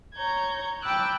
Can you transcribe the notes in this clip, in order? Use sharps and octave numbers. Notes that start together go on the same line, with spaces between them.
C#5 A#5 G6 G#6
G5 A5 B5 D6 E6 F#6